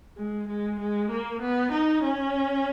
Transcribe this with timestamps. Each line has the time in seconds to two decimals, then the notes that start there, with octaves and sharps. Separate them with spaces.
0.17 G#3
0.48 G#3
0.79 G#3
1.10 A#3
1.41 B3
1.72 D#4
2.03 C#4